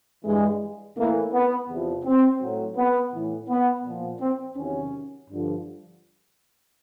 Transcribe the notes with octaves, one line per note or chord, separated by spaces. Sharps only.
G2 E3 G#3
A2 E3 A#3
B3
E2 C3 F3
C4
A2 F#3
B3
A2 E3
B3
A#2 F3
C4
E2 C3 D#3 F#3 C#4
G2 D3 F3